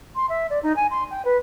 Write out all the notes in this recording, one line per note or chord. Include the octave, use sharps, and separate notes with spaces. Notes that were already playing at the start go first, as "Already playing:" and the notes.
C6
E5
D5
D#4
G#5
C6
G5
B4